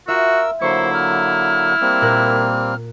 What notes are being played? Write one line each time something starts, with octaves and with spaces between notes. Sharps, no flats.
F4 F#4 A#4 E5 E6
D3 F#3 A#3 E4 C5 C#6
F6
G3 A#3 C4
A#2 A#4 F#6